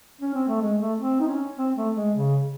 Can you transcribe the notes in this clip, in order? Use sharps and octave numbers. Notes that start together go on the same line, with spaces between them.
C#4
C4
A3
G#3
A3
C4
D#4
C#4
C4
A3
G#3
C#3